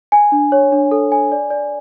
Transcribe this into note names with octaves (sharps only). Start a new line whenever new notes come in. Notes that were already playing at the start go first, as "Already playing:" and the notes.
G#5
D4
C#5
D4
A4
G#5
D5
D5